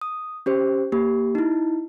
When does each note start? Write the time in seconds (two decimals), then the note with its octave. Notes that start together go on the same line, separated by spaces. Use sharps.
0.01 D#6
0.46 C#4 G4 C5
0.92 A#3 G4
1.35 D#4 E4